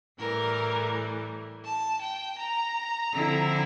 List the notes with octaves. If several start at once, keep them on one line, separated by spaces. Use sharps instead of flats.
A2 E3 G3 A#4
A5
G5
A#5
D3 F3 C4 E4